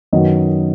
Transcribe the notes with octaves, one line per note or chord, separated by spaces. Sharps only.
F#2 D#3 F#3 B3 D#5